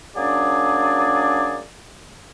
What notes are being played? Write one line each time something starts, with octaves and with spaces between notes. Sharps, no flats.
F#3 A#3 C#4 D4 G#4 D5